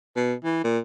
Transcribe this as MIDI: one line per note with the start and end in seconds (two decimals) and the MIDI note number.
0.16 0.34 47
0.44 0.63 52
0.64 0.78 46